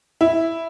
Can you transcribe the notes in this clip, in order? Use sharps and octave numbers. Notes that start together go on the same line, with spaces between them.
E4